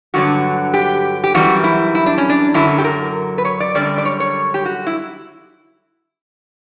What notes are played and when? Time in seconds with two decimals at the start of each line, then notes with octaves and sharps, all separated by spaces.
0.14 G2 D3 F#3 F#4
0.74 G4
1.24 G4
1.34 F#2 E3 G3 F#4
1.64 E4
1.95 E4
2.06 D4
2.18 C#4
2.29 D4
2.54 F#2 D3 F#3 E4
2.78 G4
2.84 A#4
3.38 B4
3.45 C#5
3.60 D5
3.75 F#2 D3 G3 D5
3.98 D5
4.05 C#5
4.20 C#5
4.54 G4
4.65 F#4
4.87 E4